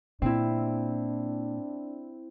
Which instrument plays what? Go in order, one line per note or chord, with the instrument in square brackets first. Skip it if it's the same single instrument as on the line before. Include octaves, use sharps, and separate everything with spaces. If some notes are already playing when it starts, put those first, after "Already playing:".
[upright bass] A#2 [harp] C4 E4 [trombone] D4